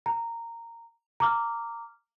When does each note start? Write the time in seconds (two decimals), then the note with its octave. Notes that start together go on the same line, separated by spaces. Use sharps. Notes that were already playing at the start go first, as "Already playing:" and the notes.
0.06 A#5
1.20 A#5 D6 F6